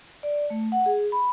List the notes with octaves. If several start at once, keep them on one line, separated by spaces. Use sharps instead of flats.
D5
A3
F#5
G#4
B5